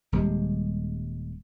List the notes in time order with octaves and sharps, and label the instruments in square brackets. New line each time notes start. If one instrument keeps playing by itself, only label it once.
[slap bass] D#1 G3 G#3